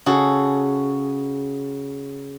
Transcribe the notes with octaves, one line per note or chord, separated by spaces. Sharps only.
C#3 F#4 G#4 A4